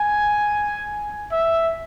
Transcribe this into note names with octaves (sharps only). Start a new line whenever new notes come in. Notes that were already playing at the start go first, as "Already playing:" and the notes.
Already playing: G#5
E5